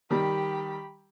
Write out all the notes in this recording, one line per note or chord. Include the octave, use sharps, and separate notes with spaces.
D#3 G3 G4 B5